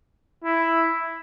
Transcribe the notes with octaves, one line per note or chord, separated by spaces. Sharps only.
E4